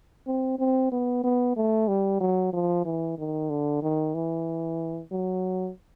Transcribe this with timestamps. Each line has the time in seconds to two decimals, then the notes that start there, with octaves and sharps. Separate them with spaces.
0.27 C4
0.59 C4
0.92 B3
1.24 B3
1.56 A3
1.88 G3
2.21 F#3
2.53 F3
2.85 E3
3.18 D#3
3.50 D3
3.82 D#3
4.14 E3
5.12 F#3